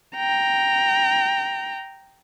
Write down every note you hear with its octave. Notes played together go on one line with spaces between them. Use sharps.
G5 A#5